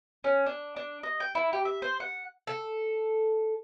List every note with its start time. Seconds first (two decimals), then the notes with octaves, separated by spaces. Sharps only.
0.24 C#4
0.46 D4
0.76 D4
1.03 D#5
1.20 G5
1.35 E4
1.53 G4
1.65 E5
1.82 C5
2.00 F#5
2.47 A4